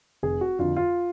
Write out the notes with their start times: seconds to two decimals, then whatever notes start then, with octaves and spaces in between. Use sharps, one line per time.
0.23 F1 G#4
0.41 F#4
0.59 F2 D3 F4
0.76 F4